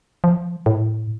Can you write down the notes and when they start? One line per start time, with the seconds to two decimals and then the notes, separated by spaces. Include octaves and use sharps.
0.24 F3
0.66 A2